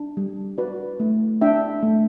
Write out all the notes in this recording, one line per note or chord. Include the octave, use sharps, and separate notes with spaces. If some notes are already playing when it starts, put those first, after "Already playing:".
Already playing: D4
G3
F#4 B4 D5
A3
D4 E5 G5
A3